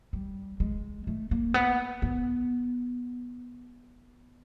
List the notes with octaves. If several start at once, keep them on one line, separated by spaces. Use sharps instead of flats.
G3
G#3
A3
A#3
B3
B3